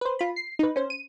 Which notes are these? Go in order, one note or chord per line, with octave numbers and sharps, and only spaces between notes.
B4 C5
F4 B5
C7
D#4 B4
C#4 C5
D#7